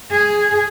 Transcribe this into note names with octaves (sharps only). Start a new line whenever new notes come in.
G#4